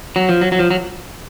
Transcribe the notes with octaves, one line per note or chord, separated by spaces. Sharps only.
F#3
F3
F#3
F#3
F3
F#3